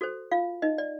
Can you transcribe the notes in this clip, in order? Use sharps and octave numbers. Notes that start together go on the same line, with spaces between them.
F#4 A4 C5
F4 F5
D#4 D#5
D5